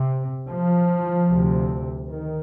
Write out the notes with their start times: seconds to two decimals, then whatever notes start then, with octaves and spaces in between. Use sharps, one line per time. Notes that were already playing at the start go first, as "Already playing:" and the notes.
Already playing: C3
0.48 F3
1.29 D2 C3
2.08 D#3